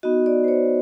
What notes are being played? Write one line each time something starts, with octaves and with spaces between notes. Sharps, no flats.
B3 D#4 F#4 D#5
D5
C5
C#5